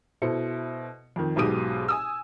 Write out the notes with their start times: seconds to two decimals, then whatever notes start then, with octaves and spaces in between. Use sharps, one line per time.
0.22 B2 E4 A4 C5 C#7
1.16 F2 D#3
1.36 B1 G#2 B2 G4 D#6 D#7
1.88 G#5 D#6 E6